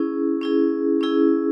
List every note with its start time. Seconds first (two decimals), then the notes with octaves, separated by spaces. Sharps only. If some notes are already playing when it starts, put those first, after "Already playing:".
Already playing: C#4 E4 G#4
0.41 C#4 E4 G#4
1.01 C#4 E4 G#4